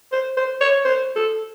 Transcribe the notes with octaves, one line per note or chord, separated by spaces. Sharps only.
C5
C5
C#5
C5
A4